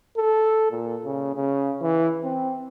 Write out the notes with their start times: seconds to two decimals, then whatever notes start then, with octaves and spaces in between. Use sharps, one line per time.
0.17 A4
0.71 A#2
1.05 C#3
1.35 C#3
1.81 E3
2.23 C4